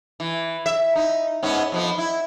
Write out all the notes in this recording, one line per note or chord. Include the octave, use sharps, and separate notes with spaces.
E3
E5
D#4
G#2 B3 C#4
F2 F3 B3
E4